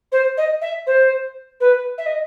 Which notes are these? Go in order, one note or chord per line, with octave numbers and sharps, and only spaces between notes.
C5
D#5
E5
C5
B4
E5
D#5